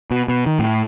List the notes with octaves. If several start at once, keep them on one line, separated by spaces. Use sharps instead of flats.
B2
B2
D#3
A2